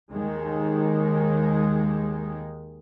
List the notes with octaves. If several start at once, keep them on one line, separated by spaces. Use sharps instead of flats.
D#2 D#3 G#3